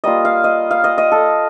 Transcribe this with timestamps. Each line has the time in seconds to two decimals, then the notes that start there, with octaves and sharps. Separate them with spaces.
0.04 G3 A#3 F4 D#5
0.25 F5
0.44 D#5
0.71 F5
0.84 D#5
0.98 D#5
1.12 A4